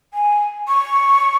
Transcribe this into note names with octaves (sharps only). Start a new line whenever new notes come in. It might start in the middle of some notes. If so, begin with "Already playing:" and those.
G#5
C#6